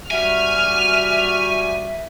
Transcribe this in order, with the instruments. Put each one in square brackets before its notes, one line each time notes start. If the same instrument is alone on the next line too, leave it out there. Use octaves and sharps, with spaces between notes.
[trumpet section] G3 F#4 [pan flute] E5 [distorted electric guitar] G#5 [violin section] F6